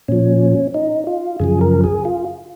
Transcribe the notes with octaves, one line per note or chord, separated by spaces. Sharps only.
A#2 F3 C#4
D#4
F4
F#2 C#3 F3 G#4
A#4
G#4
F4